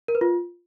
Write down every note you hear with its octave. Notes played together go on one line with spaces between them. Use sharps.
A#4
B4
F4